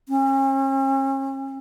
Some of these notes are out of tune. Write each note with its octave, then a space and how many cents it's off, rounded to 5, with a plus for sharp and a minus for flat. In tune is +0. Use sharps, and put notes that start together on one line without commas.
C#4 -40